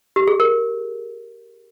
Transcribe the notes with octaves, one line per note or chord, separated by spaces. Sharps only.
G4
G#4
A#4